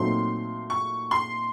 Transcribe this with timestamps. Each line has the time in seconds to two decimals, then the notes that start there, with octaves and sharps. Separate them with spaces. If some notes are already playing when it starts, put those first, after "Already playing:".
Already playing: A#2 F#3 A3 C4 D#4 C6
0.70 C#6
1.11 C6